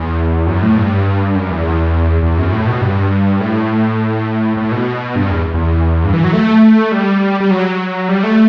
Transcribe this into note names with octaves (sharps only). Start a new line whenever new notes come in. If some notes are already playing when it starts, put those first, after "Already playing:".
Already playing: E2
F#2
A2
G2
F#2
E2
E2
F#2
A2
B2
G2
A2
A2
B2
G2
E2
E2
G2
E3
F#3
A3
G3
G3
F#3
G3
A3